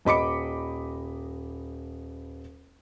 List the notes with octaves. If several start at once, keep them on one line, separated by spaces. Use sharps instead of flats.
D#1 D#5 B5 D6 C#7